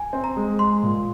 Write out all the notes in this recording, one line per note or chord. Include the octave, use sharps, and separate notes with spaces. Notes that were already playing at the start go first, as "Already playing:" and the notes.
Already playing: G#5
C4
A#5
G#3
G#3 C6
A#2